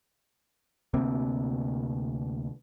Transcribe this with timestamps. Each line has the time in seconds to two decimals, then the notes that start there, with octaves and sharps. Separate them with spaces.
0.94 D2 C3 A#3 C4